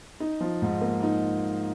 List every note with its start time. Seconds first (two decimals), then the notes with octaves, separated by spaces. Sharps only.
0.20 D#4
0.40 F3
0.62 G#2
0.81 A#3
1.03 D#4